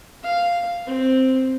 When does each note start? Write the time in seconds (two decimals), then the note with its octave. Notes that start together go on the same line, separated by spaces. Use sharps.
0.23 F5
0.87 C4